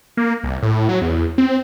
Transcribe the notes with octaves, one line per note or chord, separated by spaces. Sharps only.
A#3
C2
A2
F#3
E2
C4